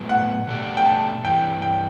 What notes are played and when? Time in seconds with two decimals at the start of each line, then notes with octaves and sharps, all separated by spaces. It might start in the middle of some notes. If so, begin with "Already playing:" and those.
Already playing: A2 F#3 B3
0.09 F#5
0.47 B2 A3 D4 G4
0.77 G5
0.85 A5
1.24 G2 E3 G3 G5
1.62 G5